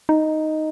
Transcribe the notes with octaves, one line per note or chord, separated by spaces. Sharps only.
D#4